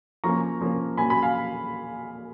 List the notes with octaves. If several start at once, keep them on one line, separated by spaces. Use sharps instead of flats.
F3 A#3 C#4 A#5 C#6
F3 A#3 C#4
A#2 F#3 C#4 G#5 B5
G#5 B5
F5 G#5